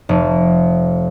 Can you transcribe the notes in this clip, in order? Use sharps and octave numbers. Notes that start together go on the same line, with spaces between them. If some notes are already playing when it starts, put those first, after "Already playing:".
F1